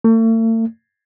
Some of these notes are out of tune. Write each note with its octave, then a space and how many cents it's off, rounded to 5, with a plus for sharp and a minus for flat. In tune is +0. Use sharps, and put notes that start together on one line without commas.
A3 +45